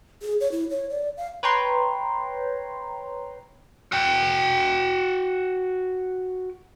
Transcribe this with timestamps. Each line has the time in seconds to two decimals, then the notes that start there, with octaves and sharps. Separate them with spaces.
0.22 G#4
0.40 C#5
0.52 E4
0.71 C#5
0.90 D5
1.17 F5
1.43 B4 C#5 G5 A#5 C6
3.92 F#4 G5